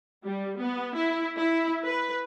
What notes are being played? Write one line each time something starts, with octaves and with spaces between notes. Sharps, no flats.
G3
B3
E4
E4
B4